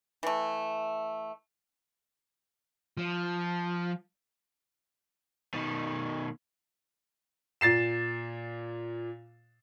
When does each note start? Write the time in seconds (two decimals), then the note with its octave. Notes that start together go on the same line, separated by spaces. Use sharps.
0.23 E3 A3
2.97 F3
5.54 B2 D#3
7.61 A#2 A6 C7 E7